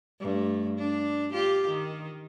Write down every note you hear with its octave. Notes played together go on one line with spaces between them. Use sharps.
G2 A3
D4
F4 G4
D#3